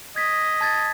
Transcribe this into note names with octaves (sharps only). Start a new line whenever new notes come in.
D#5 G#6 B6
A5 G#6 A6